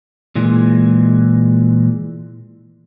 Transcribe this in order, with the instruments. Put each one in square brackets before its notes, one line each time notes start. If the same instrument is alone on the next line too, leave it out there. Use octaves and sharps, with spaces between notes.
[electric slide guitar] A#2 E3 G#3